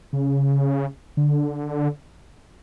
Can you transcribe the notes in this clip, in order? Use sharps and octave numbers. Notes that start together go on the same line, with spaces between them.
C#3
D3